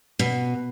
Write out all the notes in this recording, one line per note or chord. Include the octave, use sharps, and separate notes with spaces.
B2